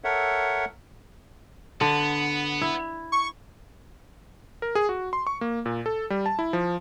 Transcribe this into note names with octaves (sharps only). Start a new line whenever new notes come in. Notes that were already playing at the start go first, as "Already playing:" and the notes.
A4 A#4 C#5 E5 F#5
D3 B3
E4
C#6
A#4
G#4
F#4
C6
C#6
A#3
A#2
A4
G3
A5
E4
F3